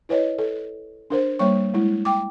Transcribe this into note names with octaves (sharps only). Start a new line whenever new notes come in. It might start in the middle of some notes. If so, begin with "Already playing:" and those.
E4 B4 C#5 D#5
A4
D4 A#4 C5
G3 A#3 C#5 C#6
G#3 E4
G5 D6